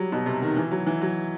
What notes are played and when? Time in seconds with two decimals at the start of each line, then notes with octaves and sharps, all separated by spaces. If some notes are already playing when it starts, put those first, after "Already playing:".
Already playing: F#3 G3
0.12 B2
0.26 C3
0.42 D#3
0.57 E3
0.71 F#3
0.87 E3
1.01 F#3